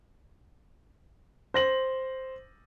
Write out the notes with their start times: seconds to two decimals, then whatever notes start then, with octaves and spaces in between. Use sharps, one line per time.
1.54 C5 A#6 F#7